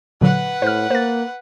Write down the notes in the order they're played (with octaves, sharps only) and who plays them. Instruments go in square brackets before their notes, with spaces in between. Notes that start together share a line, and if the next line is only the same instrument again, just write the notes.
[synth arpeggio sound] A#2 D3 F#3 [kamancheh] B4 F#5
[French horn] A2 [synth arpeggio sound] C5 F6
[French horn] A#3 [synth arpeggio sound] C5 A6